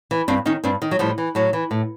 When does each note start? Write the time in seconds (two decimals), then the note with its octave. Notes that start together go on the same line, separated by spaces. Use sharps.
0.11 E3
0.28 G2 C4 D4
0.45 D#3 C#4 D#4
0.64 G2 C4 D4
0.82 D#3
0.91 F#3
0.99 A2 F3 G3
1.18 E3
1.35 A2 F#3
1.53 E3
1.71 A2